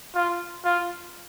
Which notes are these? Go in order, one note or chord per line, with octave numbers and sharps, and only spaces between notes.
F4
F4